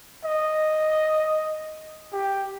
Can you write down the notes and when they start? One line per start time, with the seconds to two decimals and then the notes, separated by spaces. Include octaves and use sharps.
0.24 D#5
2.13 G4